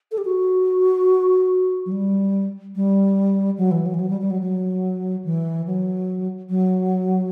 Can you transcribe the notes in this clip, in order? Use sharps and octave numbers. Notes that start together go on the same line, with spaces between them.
A4
G4
F#4
F#3
G3
G3
F#3
E3
F#3
E3
F#3
G3
G3
F#3
F#3
E3
F#3
F#3